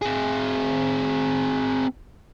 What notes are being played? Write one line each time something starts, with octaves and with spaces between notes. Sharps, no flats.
C4 G#4